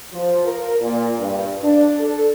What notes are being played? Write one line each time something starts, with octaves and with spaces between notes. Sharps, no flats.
F3
A#4
A#2
G2
D4
A4